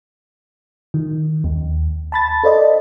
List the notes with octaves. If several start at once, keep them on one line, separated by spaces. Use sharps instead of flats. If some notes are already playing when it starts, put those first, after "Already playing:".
D#3
D#2
A5 B5 A6
A4 C5 D5 D#5